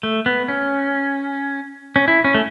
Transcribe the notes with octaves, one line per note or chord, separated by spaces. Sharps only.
A3
B3
C#4
C#4
E4
C#4
A3